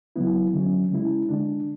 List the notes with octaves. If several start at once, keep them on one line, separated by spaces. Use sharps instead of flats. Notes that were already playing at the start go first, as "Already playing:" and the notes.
C#3 F#3 B3 E4
D3 F#3 C#4
C#3 G#3 C#4 E4
D3 G#3 D4